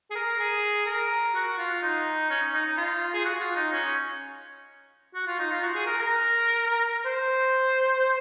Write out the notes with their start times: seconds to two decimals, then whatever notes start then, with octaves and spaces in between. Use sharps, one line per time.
0.11 G#4
0.15 A#4
0.39 G#4
0.87 A#4
1.35 F#4
1.58 F4
1.82 D#4
2.30 C#4
2.54 D#4
2.65 D#4
2.78 F4
3.14 G#4
3.25 F#4
3.40 F4
3.56 D#4
3.73 C#4
5.15 F#4
5.27 F4
5.39 D#4
5.51 F4
5.63 F#4
5.75 G#4
5.86 A#4
5.98 A#4
7.05 C5